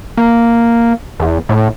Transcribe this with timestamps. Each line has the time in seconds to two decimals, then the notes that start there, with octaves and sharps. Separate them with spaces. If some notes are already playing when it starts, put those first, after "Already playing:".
0.17 A#3
1.20 E2
1.49 A2